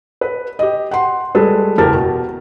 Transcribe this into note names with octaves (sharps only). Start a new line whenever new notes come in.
B4
G4 D#5
F#5 C6
G3 G#3 G#4 A4 B4
F#1 E2 G4 A#4 A5 A6
B2